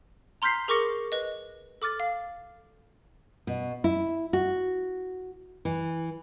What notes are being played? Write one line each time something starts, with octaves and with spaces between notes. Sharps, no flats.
A#5 C6 F6 G6 B6 C7
G#4 A#4 C#6 D6 A#6 C#7
B4 D#5
A4 D6 F6 A6
F5
B2
E4
F#4
E3